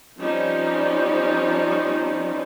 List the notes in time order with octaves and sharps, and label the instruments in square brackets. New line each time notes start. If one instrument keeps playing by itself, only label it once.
[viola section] F3 G3 C4 C#4 D#4